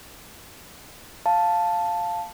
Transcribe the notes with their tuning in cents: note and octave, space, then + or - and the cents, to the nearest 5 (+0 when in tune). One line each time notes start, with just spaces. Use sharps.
F5 +0 A5 +0